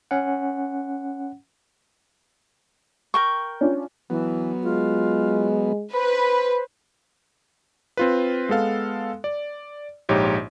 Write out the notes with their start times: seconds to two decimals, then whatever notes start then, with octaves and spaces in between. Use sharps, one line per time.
0.11 C#4 F#5
3.14 A#4 G5 C#6
3.61 C#4 D4 F4
4.10 E3 F#3 B3
4.63 G#3 F4
5.94 B4 C5 B5
7.97 C4 F4 B4
8.49 G#3 B3 A4 F5
9.24 D5
10.09 A#1 G#2 D#4 G4 C#5